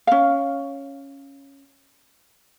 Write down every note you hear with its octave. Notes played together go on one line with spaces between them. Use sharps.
C#4 F5